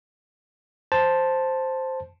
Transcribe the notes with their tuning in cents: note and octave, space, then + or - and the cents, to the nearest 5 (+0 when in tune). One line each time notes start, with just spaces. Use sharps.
C5 +0 A5 +0